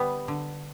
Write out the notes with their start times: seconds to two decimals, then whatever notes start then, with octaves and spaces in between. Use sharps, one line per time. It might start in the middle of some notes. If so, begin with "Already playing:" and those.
Already playing: D3 G3 B3
0.28 D3